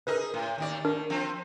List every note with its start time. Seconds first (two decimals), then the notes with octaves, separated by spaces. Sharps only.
0.07 D#4 G#4 A#4 B4 D#5
0.34 A2
0.58 D#2 D#3 D5
0.85 D#3 D4 A#4
1.10 F3 C4